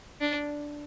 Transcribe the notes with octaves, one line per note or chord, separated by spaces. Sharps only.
D4